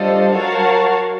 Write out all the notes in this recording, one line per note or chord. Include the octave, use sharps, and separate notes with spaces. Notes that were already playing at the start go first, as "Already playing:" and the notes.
Already playing: G3 D4 F4 A4 C5 D#5
F#3 F#4 A#4 C#5 F5 A5